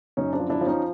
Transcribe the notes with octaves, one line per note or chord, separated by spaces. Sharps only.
F#2 C#4 D#4
C4 D4
F3
D4 E4
F3
C#4 D#4